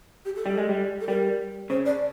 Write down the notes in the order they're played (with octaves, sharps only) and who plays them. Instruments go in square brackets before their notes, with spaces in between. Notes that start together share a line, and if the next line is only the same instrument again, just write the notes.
[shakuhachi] G4
A4
[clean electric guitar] G3
G#3
G3
[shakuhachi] A4
[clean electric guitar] G3 [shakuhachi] A#4
[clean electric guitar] C#3 [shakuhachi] C5
[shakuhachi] D5